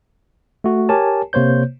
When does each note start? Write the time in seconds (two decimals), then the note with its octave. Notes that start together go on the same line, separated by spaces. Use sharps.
0.64 A3 F#4
0.89 G4 A#4 C#5 G#5 A5
1.33 C3 A#3 C5 C#5 G6